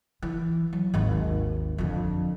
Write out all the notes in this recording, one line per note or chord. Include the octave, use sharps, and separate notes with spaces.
E3
F#3
G#1 D#2
F2 D3